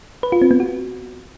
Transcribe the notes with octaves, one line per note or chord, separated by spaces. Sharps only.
B4
F4
C4
B3
F#4